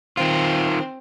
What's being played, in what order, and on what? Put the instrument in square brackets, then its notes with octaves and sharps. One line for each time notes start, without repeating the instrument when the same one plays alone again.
[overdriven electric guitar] D#3 F4 [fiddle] C4